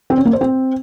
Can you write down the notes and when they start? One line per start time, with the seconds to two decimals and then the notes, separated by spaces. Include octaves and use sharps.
0.10 C4
0.18 C#4
0.25 A#3
0.33 C5
0.41 C4